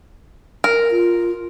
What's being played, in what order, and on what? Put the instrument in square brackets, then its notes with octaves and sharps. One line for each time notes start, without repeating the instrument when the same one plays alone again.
[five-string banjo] A#4
[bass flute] F4